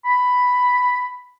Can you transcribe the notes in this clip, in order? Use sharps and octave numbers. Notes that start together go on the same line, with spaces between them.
B5